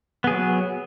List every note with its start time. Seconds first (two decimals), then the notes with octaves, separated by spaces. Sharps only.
0.24 B3
0.27 G#4
0.31 F#3